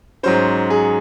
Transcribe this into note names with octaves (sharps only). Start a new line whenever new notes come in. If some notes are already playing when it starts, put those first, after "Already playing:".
G#2 F#3 C#4 C5
G#4